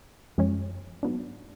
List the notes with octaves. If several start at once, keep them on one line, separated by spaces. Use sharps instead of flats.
F#2 F3 G#3 C#4
G#2 F#3 B3 D4